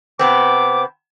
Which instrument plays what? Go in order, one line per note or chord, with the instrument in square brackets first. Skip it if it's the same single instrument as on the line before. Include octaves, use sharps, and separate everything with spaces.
[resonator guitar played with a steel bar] C3 B3 C4 [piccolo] D6